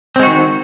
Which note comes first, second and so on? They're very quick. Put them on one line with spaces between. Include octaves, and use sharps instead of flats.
C4 G#3 F#4 D#3